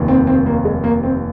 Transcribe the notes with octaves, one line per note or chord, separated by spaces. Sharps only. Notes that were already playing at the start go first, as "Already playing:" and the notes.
Already playing: F1 D#2 D#3
C4
C4
A#3
G#3
A#3
C4